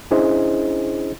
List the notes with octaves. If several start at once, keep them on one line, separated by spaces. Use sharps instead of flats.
C#4 D4 E4 G#4 C5 D#5